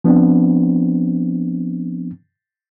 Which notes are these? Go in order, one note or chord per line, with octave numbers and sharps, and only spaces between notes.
F3 B3 C4 D4